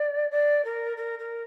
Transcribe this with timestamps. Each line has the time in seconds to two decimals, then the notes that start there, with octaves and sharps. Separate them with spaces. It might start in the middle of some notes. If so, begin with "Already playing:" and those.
Already playing: D5
0.31 D5
0.64 A#4
0.97 A#4
1.19 A#4